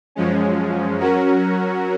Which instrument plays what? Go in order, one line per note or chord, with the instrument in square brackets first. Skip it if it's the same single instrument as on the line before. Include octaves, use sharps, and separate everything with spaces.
[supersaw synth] F#2 F3 G#3 C#4
F#3 C#4 F#4 A#4